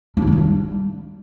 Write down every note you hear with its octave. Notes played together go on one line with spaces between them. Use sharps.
D4
F#3
D4
D#3
G3